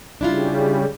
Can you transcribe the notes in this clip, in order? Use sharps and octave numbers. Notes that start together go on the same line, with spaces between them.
C#3 G3 D4 E4 F4